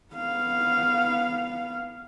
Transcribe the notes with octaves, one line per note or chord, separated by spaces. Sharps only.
B3 F5